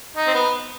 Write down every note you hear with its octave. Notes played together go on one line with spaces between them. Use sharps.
D#4
C4
B3